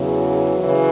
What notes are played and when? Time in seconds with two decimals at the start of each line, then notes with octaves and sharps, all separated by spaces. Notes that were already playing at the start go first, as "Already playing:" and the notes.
Already playing: E2 C#3 E3 F#3
0.59 C#3 E3